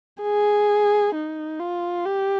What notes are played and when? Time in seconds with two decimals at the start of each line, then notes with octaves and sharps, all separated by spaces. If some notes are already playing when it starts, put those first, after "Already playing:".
0.23 G#4
1.15 D#4
1.60 F4
2.06 G4